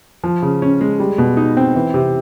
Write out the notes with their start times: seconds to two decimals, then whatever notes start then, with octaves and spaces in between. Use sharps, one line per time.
0.24 F3
0.42 C#3
0.62 C#4
0.81 G#3
1.00 G3
1.18 B2
1.37 D#4
1.57 C4
1.76 E3
1.94 C3